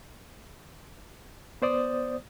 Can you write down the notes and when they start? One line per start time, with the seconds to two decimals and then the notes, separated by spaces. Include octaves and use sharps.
1.62 B3 C5 D5 D#6